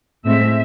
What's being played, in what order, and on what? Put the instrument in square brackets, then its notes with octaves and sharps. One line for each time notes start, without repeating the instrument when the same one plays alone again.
[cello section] A2 G#3 C4 E5